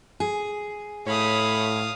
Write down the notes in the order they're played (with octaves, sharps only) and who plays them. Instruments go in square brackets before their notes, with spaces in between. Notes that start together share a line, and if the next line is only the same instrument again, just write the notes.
[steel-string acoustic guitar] G#4
[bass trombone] A2 [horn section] A3 C#5 B5 [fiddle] F5 D#6